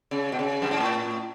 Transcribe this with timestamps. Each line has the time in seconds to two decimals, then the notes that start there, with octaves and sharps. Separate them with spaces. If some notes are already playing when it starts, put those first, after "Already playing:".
0.11 C#3
0.32 B2
0.39 C#3
0.62 F#2
0.71 G#2
0.80 A2